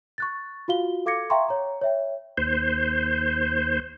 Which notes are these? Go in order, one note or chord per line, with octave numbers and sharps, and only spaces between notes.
C#6 F#6 A6
F4 F#4 F5 G7
A4 F5 D6 G#6 A#6 C#7
E5 F5 G5 A#5 C6 C#6
C#5 A#5
C#5 E5 G5
D#2 C5